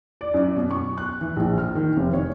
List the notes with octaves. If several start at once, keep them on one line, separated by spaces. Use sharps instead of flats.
D5
F#2
B2
C#6
F#6
E3
A#1
F6
D#3
F1
C#5